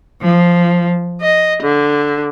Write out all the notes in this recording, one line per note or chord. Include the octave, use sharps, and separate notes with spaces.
F3
D#5
D3